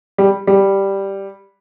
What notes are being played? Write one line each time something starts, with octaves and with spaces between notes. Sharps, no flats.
G3
G3